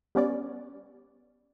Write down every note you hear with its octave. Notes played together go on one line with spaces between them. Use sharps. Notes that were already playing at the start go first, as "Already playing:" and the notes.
G3 B3 C#4 D5